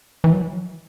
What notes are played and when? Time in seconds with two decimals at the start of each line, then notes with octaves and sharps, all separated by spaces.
0.24 E3
0.33 F#3